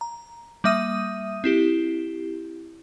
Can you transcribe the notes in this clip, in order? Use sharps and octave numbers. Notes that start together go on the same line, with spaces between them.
A#5
G3 A#3 E5 D#6 D#7
C4 E4 G4